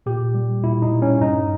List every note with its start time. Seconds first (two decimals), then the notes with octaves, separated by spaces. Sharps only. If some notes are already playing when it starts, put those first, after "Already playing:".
0.06 A#2 G4
0.34 G3
0.63 A#2 E4
0.82 D#4
0.92 G3
1.02 C#4
1.21 G2 D#4